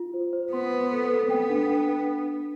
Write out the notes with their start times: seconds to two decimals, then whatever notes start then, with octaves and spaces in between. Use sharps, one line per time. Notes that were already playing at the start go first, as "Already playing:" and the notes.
Already playing: F4
0.14 C5
0.33 C5
0.52 B3 C6
0.72 B4
0.92 A4
1.11 A4
1.30 B3 G5
1.49 D4
1.69 D4